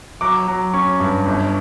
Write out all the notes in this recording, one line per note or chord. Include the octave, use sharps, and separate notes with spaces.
F#3 D6
F#3
C#4 C#6
G2
G1